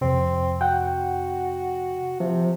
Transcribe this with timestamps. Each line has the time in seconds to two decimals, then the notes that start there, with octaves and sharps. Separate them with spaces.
0.01 F2 C3 C4
0.61 F#4 F#5 G5
2.20 C3 F3